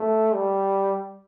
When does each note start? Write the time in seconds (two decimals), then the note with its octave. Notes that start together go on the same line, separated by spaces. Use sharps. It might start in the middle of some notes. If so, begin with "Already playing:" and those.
Already playing: A3
0.34 G3